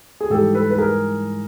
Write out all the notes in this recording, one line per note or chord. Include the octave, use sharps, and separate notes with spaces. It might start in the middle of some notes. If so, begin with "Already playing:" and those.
G#4
G#2 E3 G3 G4 A4
A4 B4
B4
G#4 A#4